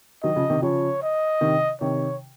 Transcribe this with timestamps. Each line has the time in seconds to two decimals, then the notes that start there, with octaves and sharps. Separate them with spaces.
0.23 D#3 F#3 D#5
0.36 C#3 F3
0.50 C3 D#3
0.62 C#3 F3 C#5
1.02 D#5
1.41 C3 D#3
1.81 C3 D#3 C#5